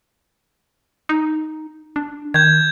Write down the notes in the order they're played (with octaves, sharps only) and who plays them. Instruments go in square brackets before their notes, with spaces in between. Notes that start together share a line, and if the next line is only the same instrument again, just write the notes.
[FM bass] D#4
D4
[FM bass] D#3 [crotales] G6 G#6